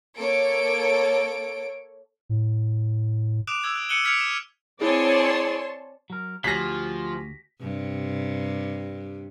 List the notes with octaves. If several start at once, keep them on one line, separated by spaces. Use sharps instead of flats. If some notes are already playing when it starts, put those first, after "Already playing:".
A#3 A4 C#5 D7
A2
D6 D#6 F#6 D7 E7 F7
D#6 E6 G#6
F#6
F#6 C#7 D#7 E7 F#7 G7
F6 G#6 B6 C#7 D7 F7
E7
C4 E4 G#4 C#5 D5 G#5 A5 C6
F#3 A#4
D2 F3 F#4 G4 G#5 A#6 B6
G2 C3